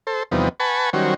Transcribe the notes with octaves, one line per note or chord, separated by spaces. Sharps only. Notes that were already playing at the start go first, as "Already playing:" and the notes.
A4 C5
E2 C3 F3 G3 B3 D#4
B4 F#5 G#5 A5 B5 C#6
D#3 F#3 G3 C#4 F#4 C5